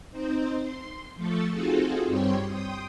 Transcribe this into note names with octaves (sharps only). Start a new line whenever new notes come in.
C4 D#4 C5
C6
F3 A3 A4 C#6 A6
C4 D#4 F4 F#4 G#4 A4
G2 G3 C4 C#5 G5 C6
G5 C6 D#6